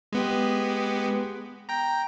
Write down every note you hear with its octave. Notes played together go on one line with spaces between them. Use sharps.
G#3 B3 G4
G5 A#5